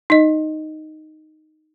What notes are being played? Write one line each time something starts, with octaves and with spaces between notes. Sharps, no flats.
D#4 D#5